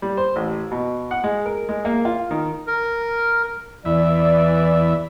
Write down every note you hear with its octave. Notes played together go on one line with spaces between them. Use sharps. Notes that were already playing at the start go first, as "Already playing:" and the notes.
G3
C5
A1
B2
F#5
G#3
A#4
G#3
A#3
F4
D#3
A#4
E2 E3 D5 E5